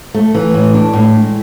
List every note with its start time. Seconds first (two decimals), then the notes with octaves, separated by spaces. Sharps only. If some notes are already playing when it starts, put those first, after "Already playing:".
0.14 A3
0.35 E3
0.54 A2
0.74 D4
0.93 A2
1.14 G#3